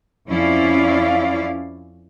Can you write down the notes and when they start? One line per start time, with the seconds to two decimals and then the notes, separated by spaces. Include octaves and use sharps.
0.28 F2 F3 C#4 E4 D5 F5